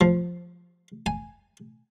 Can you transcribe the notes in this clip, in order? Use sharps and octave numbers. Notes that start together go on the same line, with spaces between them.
F3
G#5